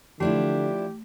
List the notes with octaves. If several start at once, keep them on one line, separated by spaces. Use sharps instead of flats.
D3 F3 A3 D4 E4 G4